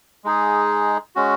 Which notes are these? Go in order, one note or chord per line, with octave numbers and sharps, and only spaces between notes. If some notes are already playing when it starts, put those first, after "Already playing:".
G#3 D#4 G#4
G#3 C#4 F#4